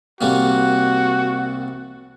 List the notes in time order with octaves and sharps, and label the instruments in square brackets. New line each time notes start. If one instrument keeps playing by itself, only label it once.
[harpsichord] C2 G3 A#3 [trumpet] F#4